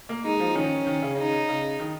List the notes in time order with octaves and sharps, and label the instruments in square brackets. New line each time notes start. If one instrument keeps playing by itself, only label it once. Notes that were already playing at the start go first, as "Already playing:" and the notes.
[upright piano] A#3
[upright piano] G#3 [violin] D#4
[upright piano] F3
[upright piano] D#3 [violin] C#4
[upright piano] D#3
C#3
[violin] D#4
[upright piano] C#3
D#3